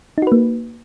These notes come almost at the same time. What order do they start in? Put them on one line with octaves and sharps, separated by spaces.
D#4 F#4 B4 A#3